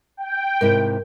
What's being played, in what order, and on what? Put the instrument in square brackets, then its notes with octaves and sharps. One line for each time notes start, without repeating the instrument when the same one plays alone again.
[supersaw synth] G5
[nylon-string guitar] G#2 C3 E4 [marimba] A#4